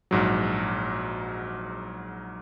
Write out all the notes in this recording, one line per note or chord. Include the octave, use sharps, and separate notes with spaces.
A#1 G#2 F#3